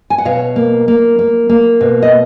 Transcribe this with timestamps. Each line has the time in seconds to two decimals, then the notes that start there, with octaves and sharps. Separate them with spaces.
0.10 G#5
0.18 F#5
0.25 B2 C#5 F5
0.56 A#3
0.88 A#3
1.19 A#3
1.49 A#3
1.81 B2
2.02 D#5